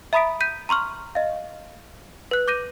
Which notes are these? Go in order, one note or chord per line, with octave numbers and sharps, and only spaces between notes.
E5 A#5 B5 D#6 B6 D7
G6 B6 D#7
A#5 C6 C#6 F6
D#5 F5
B4 F#6
D6 G6 A#6 D#7